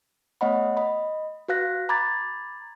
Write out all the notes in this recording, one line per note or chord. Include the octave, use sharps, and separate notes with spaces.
A3 B3 C#5 D#5 F#5 B5
D#5 B5
F#4 B4 F5 F#6 A#6
A#5 B5 D6 G#6 A6